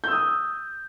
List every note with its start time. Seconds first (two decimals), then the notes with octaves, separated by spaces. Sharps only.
0.04 G6
0.08 E6
0.12 D#6